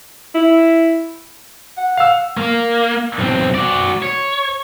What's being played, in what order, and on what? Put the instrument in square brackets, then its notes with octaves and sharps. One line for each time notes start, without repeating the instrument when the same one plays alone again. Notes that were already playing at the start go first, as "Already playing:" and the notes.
[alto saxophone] E4
[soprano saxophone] F#5
[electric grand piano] F5 E6
[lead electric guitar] A#3
B1 C4
F#4 D5
C#5